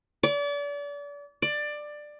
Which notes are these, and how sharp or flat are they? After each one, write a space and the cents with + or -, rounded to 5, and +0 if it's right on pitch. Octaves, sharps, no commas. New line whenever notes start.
D5 -35
D5 +15